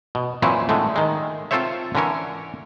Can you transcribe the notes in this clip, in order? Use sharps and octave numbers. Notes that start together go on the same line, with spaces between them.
B2
A#2 E3 F#3 C4 C#4 E4
A2 D3 G#3 A3
D#3 G#3
C4 F4 A4 C5 C#5 E5
D3 E3 C#4 A#4 C#5